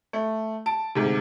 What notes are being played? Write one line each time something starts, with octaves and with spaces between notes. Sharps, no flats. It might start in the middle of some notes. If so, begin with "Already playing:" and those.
A3
A5 D7
D2 G#2 C3